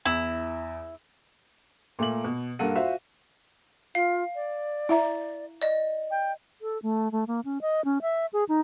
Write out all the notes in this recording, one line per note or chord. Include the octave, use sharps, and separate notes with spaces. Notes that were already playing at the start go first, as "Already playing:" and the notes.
E2 E4
A#2 A3 A#3 D6 F#7
B2
G2 A#3 A4 F#5 D#7
F4 F#4 C5 E5 F5
F4 F5
D5
E4 E5 A#5
D5 D#5
G5
A4
A3
A3
A#3
C#4
D#5
C#4
E5
G#4
D#4